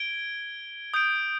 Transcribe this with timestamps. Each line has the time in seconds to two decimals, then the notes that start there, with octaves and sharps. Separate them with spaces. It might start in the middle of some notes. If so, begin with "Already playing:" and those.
Already playing: G#6 D7 G7
0.94 D#6 G6 D7